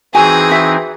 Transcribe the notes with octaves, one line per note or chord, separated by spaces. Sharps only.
E3 C4 D#4 F#4 G#4 G#5
F#4 E5